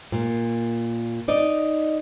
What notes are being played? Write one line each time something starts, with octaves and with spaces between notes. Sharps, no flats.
A#2
D#4 D5 D#5